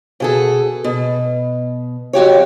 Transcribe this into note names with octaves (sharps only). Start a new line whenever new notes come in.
B2 G#4 A4
B2
F2 F#4 G4 C#5